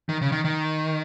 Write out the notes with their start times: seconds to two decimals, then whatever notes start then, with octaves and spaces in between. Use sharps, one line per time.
0.09 D#3
0.22 C#3
0.32 D#3
0.45 D#3